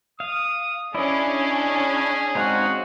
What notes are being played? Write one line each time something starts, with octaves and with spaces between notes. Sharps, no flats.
F5 D#6
C#4 D4 E4 G#4 D5 D#5
G#3 C4 D#4 F#4 C5 F5